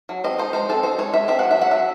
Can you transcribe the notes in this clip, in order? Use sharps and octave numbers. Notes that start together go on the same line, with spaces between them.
F#3
C4 D#5
D#4 C5
G#3 C5
C4 A4
D#4 C5
G#3 C#5
G#3 E5
C4 E5
F#3 F#5
E5
F#3 F#5
F#3 E5